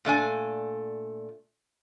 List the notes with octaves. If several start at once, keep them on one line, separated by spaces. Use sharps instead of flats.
A#2 A3 D4 G#5